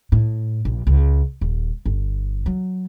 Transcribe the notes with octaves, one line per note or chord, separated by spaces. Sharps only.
A2
A#1
C#2
D#1
G1
F#3